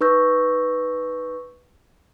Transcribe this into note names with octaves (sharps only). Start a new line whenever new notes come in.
D#4 B4 C#6 E6 G6 A#6